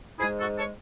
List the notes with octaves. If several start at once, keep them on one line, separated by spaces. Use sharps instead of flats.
G#2 G#3 E4 G#4
F#4 A4
A4 C#5